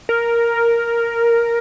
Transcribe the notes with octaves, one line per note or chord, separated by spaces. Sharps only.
A#4